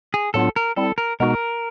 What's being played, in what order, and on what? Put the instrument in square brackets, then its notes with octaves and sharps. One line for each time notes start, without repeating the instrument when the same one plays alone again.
[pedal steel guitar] G#4
[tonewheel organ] A2 F#3 B3 D4 F4 [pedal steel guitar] A4
[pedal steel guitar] A#4
[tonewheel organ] G3 C4 E4 [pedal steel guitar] A4
[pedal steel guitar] A#4
[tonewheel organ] B2 G#3 B3 D#4 F#4 [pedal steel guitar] A#4